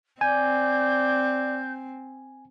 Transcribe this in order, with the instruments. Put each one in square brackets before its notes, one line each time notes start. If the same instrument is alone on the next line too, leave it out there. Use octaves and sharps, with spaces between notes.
[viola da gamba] C4 [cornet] D5 [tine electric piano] G#5 [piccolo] G6